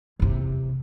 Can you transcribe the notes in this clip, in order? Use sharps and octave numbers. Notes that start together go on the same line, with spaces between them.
E2 C3